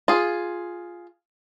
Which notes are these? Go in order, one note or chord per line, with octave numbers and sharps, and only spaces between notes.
F4 G#4